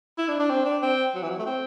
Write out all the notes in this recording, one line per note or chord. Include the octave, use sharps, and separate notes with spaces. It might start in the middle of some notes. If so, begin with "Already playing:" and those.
E4
D4
D4
C4
D4
C4
F#3
E3
F#3
A3
C4